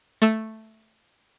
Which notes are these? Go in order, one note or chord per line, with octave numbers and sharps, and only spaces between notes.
A3 E6